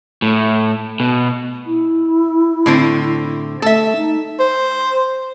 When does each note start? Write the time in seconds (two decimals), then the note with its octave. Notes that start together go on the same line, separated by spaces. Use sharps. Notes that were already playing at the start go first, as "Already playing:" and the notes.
0.22 A2
1.00 B2
1.66 E4
2.66 A2 D3 C4
3.62 A3 A4 E5
3.96 D#4
4.39 C5